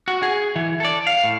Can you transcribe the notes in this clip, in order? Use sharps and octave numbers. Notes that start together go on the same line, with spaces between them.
F#4
G#4
E3
A4 D5
F5
A2